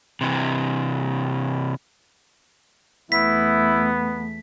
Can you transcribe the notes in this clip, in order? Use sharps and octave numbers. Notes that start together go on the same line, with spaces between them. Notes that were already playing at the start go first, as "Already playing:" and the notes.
C3 E3
E2 A3 B3 E4 B6